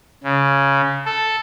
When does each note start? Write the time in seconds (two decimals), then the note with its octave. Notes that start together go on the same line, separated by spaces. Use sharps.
0.24 C#3
1.06 A4